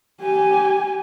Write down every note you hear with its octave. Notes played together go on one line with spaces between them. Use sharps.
G4 G#5